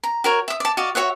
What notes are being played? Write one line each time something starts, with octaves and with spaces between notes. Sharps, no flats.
A#5
F#4 A#4 C#5
E5 D#6
D5 A5
F#4 D5 D#5 F5
F#4 C#5 E5 F#5